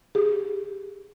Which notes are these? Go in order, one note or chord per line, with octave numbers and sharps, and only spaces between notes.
G4 G#4